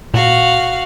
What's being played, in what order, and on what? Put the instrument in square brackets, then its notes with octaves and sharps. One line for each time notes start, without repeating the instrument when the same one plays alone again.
[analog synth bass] A#2 [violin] F#4 F5